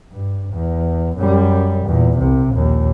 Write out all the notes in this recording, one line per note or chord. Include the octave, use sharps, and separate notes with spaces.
G2
E2
F#2 G3
E2 A#2
C2 C3
A#1 D#2